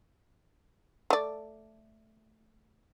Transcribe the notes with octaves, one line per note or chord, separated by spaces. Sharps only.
A3 D5